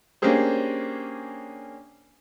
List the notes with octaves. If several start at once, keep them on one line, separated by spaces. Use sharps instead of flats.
A#3 C#4 D4 G4 G#4 C5